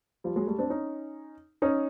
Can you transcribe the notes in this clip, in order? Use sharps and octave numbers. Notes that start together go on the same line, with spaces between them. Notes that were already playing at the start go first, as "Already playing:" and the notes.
F3 G3
F#3 G#3
G3 A3
C4 D4
C#4 D#4
C#4 D#4